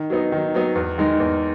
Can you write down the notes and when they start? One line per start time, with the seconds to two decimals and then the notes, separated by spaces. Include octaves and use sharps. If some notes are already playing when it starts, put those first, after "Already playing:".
Already playing: D#3
0.10 F#3 B3 D#4
0.32 D#3
0.54 F#3 B3 D#4
0.75 E2
0.98 D#3 G#3 D#4
1.20 E2